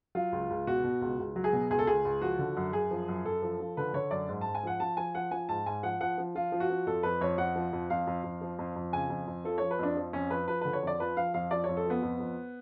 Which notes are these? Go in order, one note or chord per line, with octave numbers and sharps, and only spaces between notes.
F#3 F4
C#2
C#2
B2 F#4
B2
C#2
C#2
F#3
G#4
B2
C#2 G#4
A4
C#2 G#4
C#2
F3 F#4
D3
F#2
F#2 G#4
F3
F#2
F#2 A4
F3
F3
D3 B4
D3 C#5
F#2 D5
G#2
G#2 A5
G#5
F3 F#5
F3 A5
F3 G#5
F3 F#5
F3 G#5
G#2 A5
G#2 G#5
F3 F#5
F3 F#5
F3
F3 F4
F3
F#4
F3
F2 A4
F2 B4
F2 C#5
F2 F#5
F3
F2
F2 F5
F2
F2
F3
F2
F2
C#3 G#5
F2
F2
F3 A4
F3 C#5
B4
F2 D4
F3
F2 C#4
F3 B4
F3 B4
D3 B4
C#5
F2 D5
F3 B4
F3 F5
F2 F5
F3 D5
F2 C#5
A4
F3 B3
F2
F2